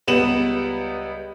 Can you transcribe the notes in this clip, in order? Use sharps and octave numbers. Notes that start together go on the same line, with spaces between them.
C#2 G3 B3 E7 F#7